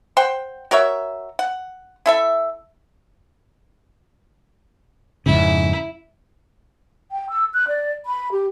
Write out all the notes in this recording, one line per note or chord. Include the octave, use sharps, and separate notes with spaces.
C5 F#5 G5
F#4 A#4 C#5 E5
F#5
E4 A4 E5
F2 G#2 C#3 E4
G5
E6
F#6
D5
B5
G4